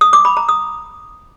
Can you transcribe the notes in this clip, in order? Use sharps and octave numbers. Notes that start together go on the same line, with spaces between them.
D#6
D6
B5
A#5
D#6